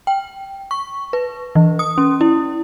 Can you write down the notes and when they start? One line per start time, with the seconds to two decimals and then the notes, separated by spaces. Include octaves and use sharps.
0.07 G5
0.71 C#6
1.13 B4
1.55 E3
1.79 D#6
1.98 C#4
2.21 E4